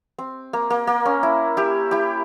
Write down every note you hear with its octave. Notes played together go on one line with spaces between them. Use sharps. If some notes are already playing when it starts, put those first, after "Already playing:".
C4
A#3
A#3
A#3
C#4
E4
E4 G4
E4 G4